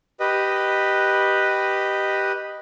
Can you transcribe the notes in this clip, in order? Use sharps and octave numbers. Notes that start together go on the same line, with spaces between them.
G4 B4 D#5